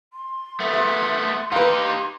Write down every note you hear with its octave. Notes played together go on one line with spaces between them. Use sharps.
C6
A3 B3
E5
D#4 G4 B4 F5